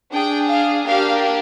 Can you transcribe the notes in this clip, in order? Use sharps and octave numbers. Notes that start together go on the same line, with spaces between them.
D4 G#4 G5
F5
A#3 D4 G4 F5